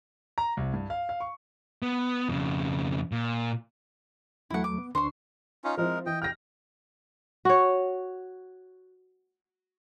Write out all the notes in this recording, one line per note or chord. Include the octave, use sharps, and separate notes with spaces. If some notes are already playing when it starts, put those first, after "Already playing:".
A#5
C2
G2
F5
F5
C#6
B3
F2 C#3
A#2
E2 F#3 A3 E4 F#5
D6
B3
D2 D4 C5 C6 C#6
C#4 D#4 F4
F3 G#3 C4 E4 A#4
E3 D#5 G5
G5 F6 A#6
F#4 C#5